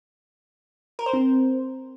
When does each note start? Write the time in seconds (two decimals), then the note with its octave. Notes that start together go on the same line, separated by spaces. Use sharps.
0.99 A#4
1.06 C5
1.13 C4